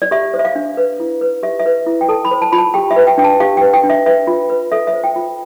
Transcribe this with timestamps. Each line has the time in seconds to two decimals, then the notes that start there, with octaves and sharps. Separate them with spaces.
0.02 D5
0.11 G4 E5
0.34 C5
0.39 E5
0.45 F5
0.56 D4
0.77 B4
1.00 E4
1.21 B4
1.43 G4 E5
1.60 E5
1.66 B4
1.86 E4
2.01 G5
2.09 A4 A5
2.25 B5
2.31 C5
2.42 A5
2.52 F4 B5
2.58 A5
2.74 G4 G5
2.91 E5
2.96 B4
3.07 G5
3.18 D4 G5
3.24 A5
3.40 G4 F5
3.57 G5
3.61 B4
3.74 G5
3.84 D4
3.90 E5
4.06 B4 E5
4.27 F4
4.50 B4
4.72 A4 E5
4.87 E5
4.93 C5
5.04 G5
5.16 F4